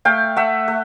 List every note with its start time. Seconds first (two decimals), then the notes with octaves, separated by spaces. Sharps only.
0.05 A3 F5 G5
0.36 A3 E5 F#5
0.68 A3